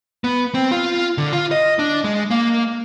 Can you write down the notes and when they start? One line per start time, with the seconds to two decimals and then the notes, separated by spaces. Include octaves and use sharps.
0.24 B3
0.54 C4
0.71 F4
1.18 D3
1.33 F4
1.52 D#5
1.79 D4
2.04 G#3
2.30 A#3